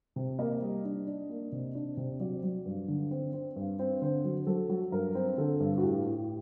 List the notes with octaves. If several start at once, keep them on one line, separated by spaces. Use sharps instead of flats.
C3
A#3 D#5
G3
D4
D4
A#3
C3
D4
C3
F#3 D5
F#3
G2
D3
C4
C4
G2
C4
D3 C5
F#3
F#3 A4
F#3
G2 A#4
C4
D3 A4
G2
F#4
A2 G4
A2